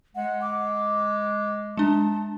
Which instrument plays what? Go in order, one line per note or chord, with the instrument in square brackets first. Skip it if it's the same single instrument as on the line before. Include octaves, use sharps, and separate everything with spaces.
[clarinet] G#3 [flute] F#5
[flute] D6
[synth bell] G#3 D4 [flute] A5